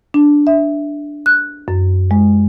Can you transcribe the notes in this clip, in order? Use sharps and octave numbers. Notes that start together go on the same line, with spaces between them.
D4
E5
F#6
F#2
G#3